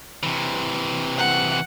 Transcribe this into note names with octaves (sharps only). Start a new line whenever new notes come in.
C3 E3
F#5